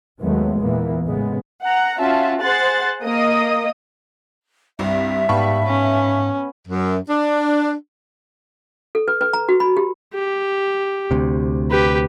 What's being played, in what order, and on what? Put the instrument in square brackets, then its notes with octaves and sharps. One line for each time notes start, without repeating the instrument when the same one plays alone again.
[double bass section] D#2 D#3 F#3 G#3 A3 B3
E2 A#2 E3 A#3 B3
A1 C#3 G#3 B3
[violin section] F#5 A#5
C#4 F4 F#4 E5 A5
G#4 C5 F#5 C6 F#6 A6
A#3 D#5 D#6
[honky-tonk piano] C2 G2 C4 [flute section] E5
[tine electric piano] G#2 F5 A5 [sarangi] G3 [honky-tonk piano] B3 B5 C#6
[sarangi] C#4
[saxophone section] F#2
D4
[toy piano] A4
B4
B4
A#5
F#4
B5
G4
[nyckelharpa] G4
[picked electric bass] D2 C3
[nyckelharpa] G4 B4